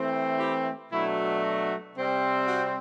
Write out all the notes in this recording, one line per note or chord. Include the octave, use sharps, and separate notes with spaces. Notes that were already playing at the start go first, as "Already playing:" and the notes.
Already playing: E3 A3 C4
E4 G4
B2 F#3 A3 D4 E4
F#4
C3 G3 C4
F#4